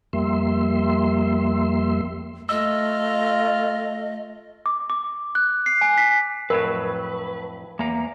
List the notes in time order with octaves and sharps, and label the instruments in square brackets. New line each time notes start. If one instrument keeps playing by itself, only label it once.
[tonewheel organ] F2 G3 A#3 E5 C6
[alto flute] A3 [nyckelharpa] F4 F5 [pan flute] D#5 [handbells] E6
[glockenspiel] D6
D6
F#6
C7
G#5
B6
[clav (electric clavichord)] F2 A2 F#3 [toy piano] A#4 [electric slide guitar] B4
[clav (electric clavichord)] E2 [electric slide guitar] A#3 A#5